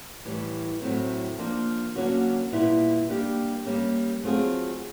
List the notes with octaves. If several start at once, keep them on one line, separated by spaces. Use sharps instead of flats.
A2 E3 G3
A2 F#3 A3 C4
F3 A#3 D4
D3 F#3 A#3 C#4 F#4
A#2 G3 B3 E4
G3 A#3 D4 G4
G3 A#3 C#4
F#3 A3 C4 F4 G#4